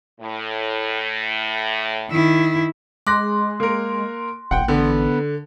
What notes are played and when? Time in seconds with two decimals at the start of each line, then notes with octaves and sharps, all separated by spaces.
0.21 A2
2.10 D#3 E4
3.07 G#3 C6 D6 F#6 A#6
3.60 A#3 A#4
4.51 D#1 A1 F#5 G5
4.68 D3 B3